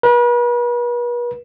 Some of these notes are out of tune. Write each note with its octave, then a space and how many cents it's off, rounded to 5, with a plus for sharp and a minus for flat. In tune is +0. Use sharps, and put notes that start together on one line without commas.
B4 -40